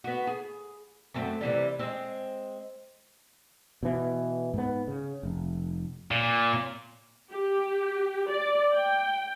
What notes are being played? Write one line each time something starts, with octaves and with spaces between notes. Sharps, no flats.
B3 F#4
G#4
F#2 A3 C4
C3 E3 G3
G#3 C4
B2 E3
G#2 B3
C#3
F1
A#2
G4
D5
G5